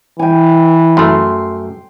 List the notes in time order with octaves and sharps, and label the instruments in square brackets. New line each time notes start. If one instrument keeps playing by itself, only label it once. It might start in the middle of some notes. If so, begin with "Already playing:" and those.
[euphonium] E3 [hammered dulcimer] G5 G#5
[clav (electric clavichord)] F#2 A3 [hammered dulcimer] C6